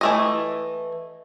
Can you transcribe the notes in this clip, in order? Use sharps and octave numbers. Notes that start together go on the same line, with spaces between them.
E3 A3 D#5